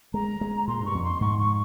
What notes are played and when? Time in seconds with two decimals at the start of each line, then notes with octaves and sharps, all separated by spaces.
0.14 G#3 A#5
0.41 G#3
0.68 A#2 C6
0.80 G2 C#6
0.95 F2
1.03 C6
1.21 G#2 C#6
1.39 C#6